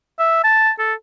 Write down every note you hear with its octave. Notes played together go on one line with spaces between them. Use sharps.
E5
A5
A4